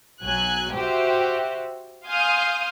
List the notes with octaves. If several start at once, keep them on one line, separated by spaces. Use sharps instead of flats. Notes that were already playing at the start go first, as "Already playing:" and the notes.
B1 F#3 G#5 F#6
F#4 G4 C5 E5
F5 G#5 C6 D#6 F6 G6